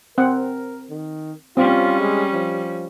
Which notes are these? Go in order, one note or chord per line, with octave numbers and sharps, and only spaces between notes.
C4 A#4 F#5
D#3
G3 C4 C#4 F4
G#3
F3